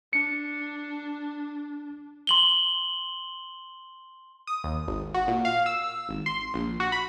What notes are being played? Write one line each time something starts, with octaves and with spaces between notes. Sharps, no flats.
D4 C#7
C6 F#7 G7
D#6
D#2
G#1
F#4
A#2
F5
E6
G#1
C6
A#1
F#4
B5